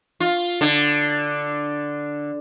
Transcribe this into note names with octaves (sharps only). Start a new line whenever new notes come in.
F4
D3